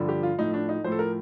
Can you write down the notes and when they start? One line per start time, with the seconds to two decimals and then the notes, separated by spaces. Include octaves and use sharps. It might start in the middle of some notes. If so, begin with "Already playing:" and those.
Already playing: G2 D3 F3
0.09 G4
0.23 F4
0.38 A2 F3 D#4
0.54 D4
0.69 D#4
0.84 A2 F3 C5
0.92 A4
0.99 A#4